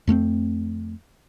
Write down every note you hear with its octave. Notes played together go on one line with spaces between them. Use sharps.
F2 A3 A#3 C4